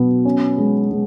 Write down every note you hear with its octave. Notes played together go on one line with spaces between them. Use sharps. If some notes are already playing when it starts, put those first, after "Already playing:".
Already playing: B2 F#3 B3
C#4
G#3
G#3